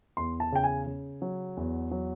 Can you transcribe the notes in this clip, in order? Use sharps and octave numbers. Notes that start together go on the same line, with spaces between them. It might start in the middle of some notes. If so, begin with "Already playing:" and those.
E2 C6
A5
C#3 G5
G#5
C#3
F#3
E2
F#3